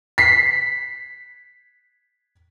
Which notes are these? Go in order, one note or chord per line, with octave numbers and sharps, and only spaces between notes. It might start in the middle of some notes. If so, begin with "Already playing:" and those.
B6 C7